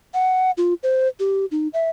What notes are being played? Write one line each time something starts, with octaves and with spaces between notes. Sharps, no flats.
F#5
F4
C5
G4
D#4
E5